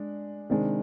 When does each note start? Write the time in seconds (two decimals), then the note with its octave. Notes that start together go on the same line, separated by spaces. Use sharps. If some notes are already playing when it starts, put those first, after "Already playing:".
Already playing: G#3 D4
0.50 C3 D#3 G#3 D4